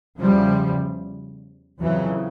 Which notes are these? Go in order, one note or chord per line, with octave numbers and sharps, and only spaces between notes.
E2 C#3 F3 G3
F2 C#3 E3 F#3